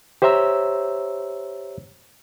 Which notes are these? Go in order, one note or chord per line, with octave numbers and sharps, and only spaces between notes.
G4 C5 C#5 E5 A#5 E6